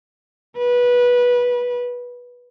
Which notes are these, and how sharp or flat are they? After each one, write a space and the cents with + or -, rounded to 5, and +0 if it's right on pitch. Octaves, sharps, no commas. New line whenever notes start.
B4 -15